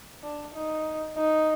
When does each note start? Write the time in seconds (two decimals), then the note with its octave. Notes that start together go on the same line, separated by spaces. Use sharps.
0.23 D4
0.54 D#4
1.17 D#4